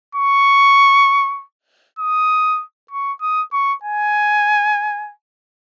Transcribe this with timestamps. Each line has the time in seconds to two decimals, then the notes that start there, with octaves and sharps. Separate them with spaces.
0.15 C#6
1.99 D#6
2.91 C#6
3.21 D#6
3.53 C#6
3.83 G#5